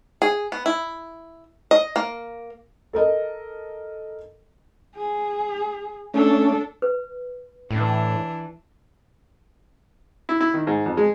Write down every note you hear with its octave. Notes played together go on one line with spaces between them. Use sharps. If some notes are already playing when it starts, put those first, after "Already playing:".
G#4
B3
E4
D#5
A#3
A4 A#4 D#5
G#4
A3 C#4 D4 A4
B4
A2 E3 D4
E4
E4
D#3
G#2
F2
G#3